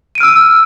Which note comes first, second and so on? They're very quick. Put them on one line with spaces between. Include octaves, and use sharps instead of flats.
D#7 D7 F6 E6